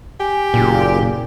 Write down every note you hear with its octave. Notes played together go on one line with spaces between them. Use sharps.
G4 G#5
F#1 A#2